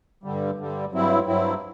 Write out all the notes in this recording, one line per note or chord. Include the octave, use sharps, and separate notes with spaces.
G2 D3 G3
G2 D3 G3
G2 F#3 C4 E4
G2 F#3 C4 E4